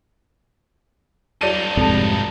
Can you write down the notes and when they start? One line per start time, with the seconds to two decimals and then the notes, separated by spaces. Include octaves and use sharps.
1.41 G2 F#3 D#4 D5 A5 D#7
1.77 F2 G#2 C3 A4 A5